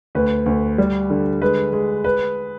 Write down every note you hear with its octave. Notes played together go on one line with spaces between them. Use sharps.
D2 B4
D2
G3
D3
G#3 B4
G#3
B4